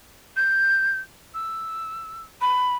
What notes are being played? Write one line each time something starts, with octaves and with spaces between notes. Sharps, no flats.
G6
E6
B5